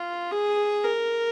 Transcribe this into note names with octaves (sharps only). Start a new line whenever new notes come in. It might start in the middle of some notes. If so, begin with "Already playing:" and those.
Already playing: F4
G#4
A#4